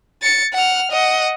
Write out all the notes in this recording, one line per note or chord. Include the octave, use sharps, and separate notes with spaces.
A6 C#7
F#5 F6
D#5 F#5